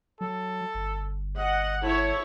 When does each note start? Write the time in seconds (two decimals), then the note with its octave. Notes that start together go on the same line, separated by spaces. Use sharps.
0.21 F#3 A4
0.74 G1
1.38 D#5 F#5
1.83 E4 A4 C#5